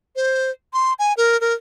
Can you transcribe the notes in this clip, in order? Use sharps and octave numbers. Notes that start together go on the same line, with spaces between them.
C5
C6
G#5
A#4
A#4